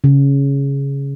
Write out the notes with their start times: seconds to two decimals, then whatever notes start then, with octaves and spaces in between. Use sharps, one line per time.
0.04 C#3